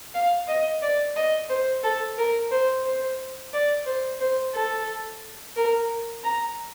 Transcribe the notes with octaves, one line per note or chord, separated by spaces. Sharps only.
F5
D#5
D5
D#5
C5
A4
A#4
C5
C5
D5
C5
C5
A4
A#4
A#5